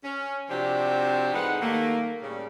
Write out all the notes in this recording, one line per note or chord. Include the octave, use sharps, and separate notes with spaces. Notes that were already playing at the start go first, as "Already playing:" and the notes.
C#4
C3 F3 C4 D4 F#4 G4
A2 G#3 D#4 B4 F#5
D#3 G3 A3 A#3
A2 C#3 G3